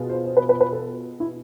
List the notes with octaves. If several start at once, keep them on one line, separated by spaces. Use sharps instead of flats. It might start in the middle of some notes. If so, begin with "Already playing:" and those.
Already playing: B2 B3 F4 G#4
C5
C5
B4
B4
B4
A4
E4